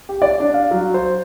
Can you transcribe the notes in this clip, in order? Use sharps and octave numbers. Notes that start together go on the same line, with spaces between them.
G4
D5
D4
F5
F#3
C5